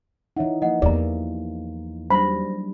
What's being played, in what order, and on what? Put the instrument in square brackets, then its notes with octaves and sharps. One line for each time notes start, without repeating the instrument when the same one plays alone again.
[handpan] E3 D#4 [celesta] C#5 E5 F#5
[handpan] F3 A#3 [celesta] D#5 F#5
[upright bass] E2 [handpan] A#3 [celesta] G4 A#5 [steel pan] D5
[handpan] F#3 G3 D4 [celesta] C5 A#6 [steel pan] B5